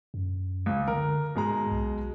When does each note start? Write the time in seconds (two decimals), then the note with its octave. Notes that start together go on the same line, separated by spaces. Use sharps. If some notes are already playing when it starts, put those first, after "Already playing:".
0.14 F#2
0.66 C#2
0.88 D3 A#4
1.35 G#2 B2 G#3 A#5
1.71 B1